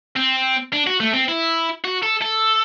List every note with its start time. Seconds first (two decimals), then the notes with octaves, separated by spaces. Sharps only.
0.17 C4
0.73 D4
0.87 F#4
1.00 A3
1.14 C4
1.28 E4
1.84 F#4
2.03 A4
2.22 A4